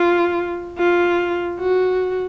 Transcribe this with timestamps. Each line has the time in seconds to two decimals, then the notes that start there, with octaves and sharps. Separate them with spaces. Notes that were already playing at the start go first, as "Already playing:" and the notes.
Already playing: F4
0.79 F4
1.59 F#4